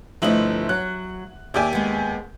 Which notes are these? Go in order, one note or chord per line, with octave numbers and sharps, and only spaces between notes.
G1 F3 A3 E4 D#5 F#7
F#3 F#6
D#2 G4 D5 E5 G#5
G#3 B3